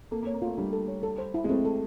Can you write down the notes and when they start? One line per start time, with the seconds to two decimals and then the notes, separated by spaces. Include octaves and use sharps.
0.11 A#3 A4
0.22 A#3
0.27 C#5
0.34 A#3
0.42 A3 F4
0.57 G3 D4
0.73 A4
0.88 C#5
1.03 A4
1.18 C5
1.34 E4
1.44 G#3
1.49 A3 C4
1.65 A4